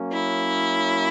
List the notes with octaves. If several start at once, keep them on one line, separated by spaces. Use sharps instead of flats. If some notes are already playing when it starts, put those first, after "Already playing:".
Already playing: F#3 A#3 C#4
E4